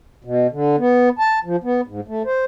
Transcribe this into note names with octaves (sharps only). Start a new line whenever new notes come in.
B2
D3
B3
A5
F3
B3
G#2
A3
C5